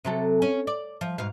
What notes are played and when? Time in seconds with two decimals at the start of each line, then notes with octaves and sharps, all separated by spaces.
0.04 C3 F#3 A4
0.42 C#4
0.67 D5
1.01 F3
1.18 G#2 B2 F5